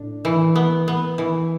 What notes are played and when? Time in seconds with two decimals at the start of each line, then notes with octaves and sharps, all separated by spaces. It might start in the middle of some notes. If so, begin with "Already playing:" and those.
Already playing: A2 D4
0.25 E3
0.56 B3
0.88 B3
1.18 E3